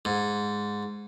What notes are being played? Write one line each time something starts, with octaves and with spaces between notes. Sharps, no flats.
G#2